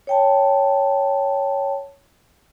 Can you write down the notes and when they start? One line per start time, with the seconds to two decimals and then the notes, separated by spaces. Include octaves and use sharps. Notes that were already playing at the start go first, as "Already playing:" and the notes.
0.07 C#5 G5 A5